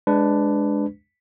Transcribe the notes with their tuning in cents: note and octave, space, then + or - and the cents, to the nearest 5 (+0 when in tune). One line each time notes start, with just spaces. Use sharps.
G#3 +0 D4 +0 B4 +20